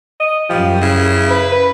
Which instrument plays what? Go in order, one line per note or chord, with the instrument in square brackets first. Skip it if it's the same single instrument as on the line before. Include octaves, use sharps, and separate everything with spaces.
[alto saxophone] D#5
[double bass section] F#2 [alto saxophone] F3 [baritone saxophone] G3
[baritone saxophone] C#3 [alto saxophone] E4
[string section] B4